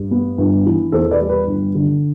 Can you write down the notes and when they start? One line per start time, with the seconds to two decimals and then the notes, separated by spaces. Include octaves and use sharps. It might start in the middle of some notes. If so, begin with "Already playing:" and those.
Already playing: G2
0.11 B3
0.38 G1
0.66 E3
0.92 E2 A4 C5
1.11 B4 D5
1.21 G3
1.29 B4
1.47 G1
1.75 D3